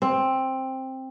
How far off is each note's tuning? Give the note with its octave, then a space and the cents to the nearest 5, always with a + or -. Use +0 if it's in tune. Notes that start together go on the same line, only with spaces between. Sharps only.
C4 +10